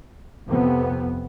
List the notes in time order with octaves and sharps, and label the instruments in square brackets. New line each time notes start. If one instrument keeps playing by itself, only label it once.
[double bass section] F2 C3 B3